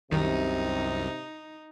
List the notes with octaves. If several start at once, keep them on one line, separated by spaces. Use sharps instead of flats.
C2 F#2 C3 D#3 D#4